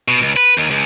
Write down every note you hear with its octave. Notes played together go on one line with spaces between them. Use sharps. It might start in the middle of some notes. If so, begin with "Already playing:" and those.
B2
C#2
B4
D#2
C#2